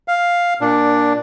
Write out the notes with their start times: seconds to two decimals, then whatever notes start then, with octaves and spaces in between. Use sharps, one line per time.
0.08 F5
0.61 A#2 D4